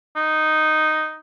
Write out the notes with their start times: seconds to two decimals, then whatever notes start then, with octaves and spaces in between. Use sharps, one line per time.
0.16 D#4